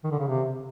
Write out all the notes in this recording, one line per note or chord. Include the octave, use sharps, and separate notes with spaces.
D#3
D3
C#3
C3